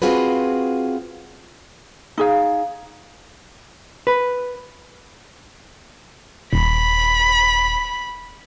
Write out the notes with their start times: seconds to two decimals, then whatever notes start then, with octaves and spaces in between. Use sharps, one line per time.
0.02 C4 F4 F#4 G#4 B4
2.18 D#4 G#4 F5
4.07 B4
6.53 D#1 B5